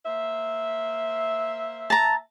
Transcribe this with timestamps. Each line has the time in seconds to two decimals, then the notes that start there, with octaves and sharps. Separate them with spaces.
0.06 A#3 C5 E5
1.90 A5 A#5